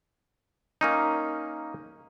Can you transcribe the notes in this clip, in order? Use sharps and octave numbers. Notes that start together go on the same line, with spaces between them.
A#3 C#4 D#4